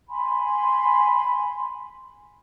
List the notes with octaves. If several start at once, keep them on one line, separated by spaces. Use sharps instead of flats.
G#5 B5 C6